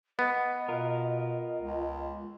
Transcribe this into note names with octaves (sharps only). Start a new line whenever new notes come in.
B3 D#5
B2 F4 A#4
C#2